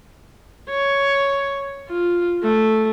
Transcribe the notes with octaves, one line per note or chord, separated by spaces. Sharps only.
C#5
F4
A3